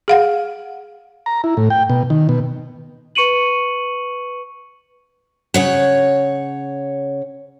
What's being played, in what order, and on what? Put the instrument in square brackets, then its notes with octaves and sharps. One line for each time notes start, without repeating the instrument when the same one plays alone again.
[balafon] G#4 F5 F#5
[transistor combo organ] A#5
E4
A2
G5
B2
D#3
B2
[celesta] B4 C#6 C#7 D#7 F#7
[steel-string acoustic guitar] C#3 C#5 F#5